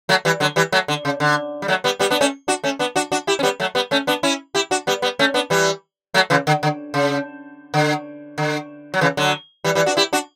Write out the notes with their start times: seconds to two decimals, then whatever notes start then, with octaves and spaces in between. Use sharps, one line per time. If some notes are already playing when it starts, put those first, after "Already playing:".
0.09 F#3 A3
0.25 E3 G3
0.40 D3 F#3
0.56 E3 G3
0.72 F#3 A3
0.88 D3
1.05 C#3
1.20 D3
1.62 G3
1.68 F#3 A3
1.84 G3 B3
1.99 G3 B3
2.10 B3 D4
2.21 A3 C#4
2.48 D4 F#4
2.64 A3 C#4
2.79 B3 D4
2.96 D4 F#4
3.12 D4 F#4
3.27 E4 G4
3.39 C#4
3.43 G3 B3
3.60 F#3 A3
3.75 G3 B3
3.91 A3 C#4
4.07 B3 D4
4.23 C#4 E4
4.55 E4 G4
4.71 D4 F#4
4.87 G3 B3
5.02 G3 B3
5.19 A3 C#4
5.34 B3 D4
5.50 E3 G3
6.14 F#3 A3
6.30 C#3 E3
6.47 D3
6.63 D3
6.94 C#3
7.74 D3
8.38 D3
8.94 F#3
9.01 C#3 E3
9.17 D3 F#3
9.64 E3 G3
9.75 E3 G3
9.86 D4 F#4
9.97 E4 G4
10.13 D4 F#4